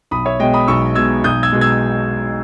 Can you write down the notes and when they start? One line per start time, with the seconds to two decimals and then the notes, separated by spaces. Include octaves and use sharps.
0.11 B1 B5 D#6
0.25 C#5 E5
0.40 B2 G#3 D#5 G5
0.54 B5 D#6
0.67 B1 C#6 E6
0.95 B2 G#3 E6 G#6
1.24 B1 D#6 G6
1.43 E6 G#6
1.52 B2 G#3
1.61 E6 G#6